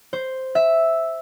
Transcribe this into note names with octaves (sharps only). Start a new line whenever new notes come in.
C5
E5